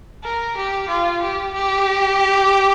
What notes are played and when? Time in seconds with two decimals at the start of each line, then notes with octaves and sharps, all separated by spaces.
0.24 A#4
0.57 G4
0.89 F4
1.22 G4
1.54 G4